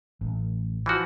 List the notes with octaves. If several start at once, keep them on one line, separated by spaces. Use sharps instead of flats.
A1
E3 F3 F#4